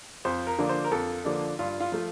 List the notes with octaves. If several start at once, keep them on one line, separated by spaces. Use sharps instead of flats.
F2 C5
A#4
D3 F3 A#3 D4
C5
A#4
F2 A4
D3 F3 A#3 D4
G2 F4
F4
F3 A3